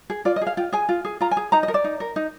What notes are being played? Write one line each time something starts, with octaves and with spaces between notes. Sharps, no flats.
G#4
F4 D5
D#5
G#4
F5
F4 G5
G#4 G#5
F4
G#4
F4 A#5
G#5
G#4
D#4 A#5
D#5
A#4
D5
D#4
A#4
D#4